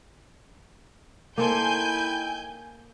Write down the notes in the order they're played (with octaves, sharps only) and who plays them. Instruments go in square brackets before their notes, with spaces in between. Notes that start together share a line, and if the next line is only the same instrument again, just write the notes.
[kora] A#3 A4 C5 [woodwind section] D#4 E4 G5 [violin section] G#5 G6